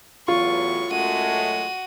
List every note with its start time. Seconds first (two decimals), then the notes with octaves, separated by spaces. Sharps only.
0.28 E2 A2 F#3 F4 C#6
0.91 F#2 G#3 A3 F#4 D#7